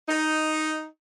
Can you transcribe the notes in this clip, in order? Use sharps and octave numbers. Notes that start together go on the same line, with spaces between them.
D#4